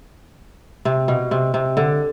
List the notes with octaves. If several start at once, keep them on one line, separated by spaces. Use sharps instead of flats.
C3
B2
C3
C3
D3